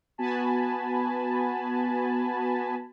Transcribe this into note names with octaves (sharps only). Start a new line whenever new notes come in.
B3 F#4 G#5 A5 B5